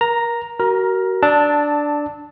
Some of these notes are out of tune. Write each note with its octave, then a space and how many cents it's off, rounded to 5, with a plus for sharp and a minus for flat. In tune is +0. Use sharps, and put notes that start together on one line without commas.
A#4 +25 A#5 +0
F#4 +30 A#4 +0 A#5 +20
D4 +0 A5 +10 E6 -30